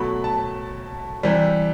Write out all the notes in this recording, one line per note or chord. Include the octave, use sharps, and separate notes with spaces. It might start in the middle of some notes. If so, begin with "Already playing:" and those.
Already playing: B2 F#3 A3 B5
A5
C3 E3 G3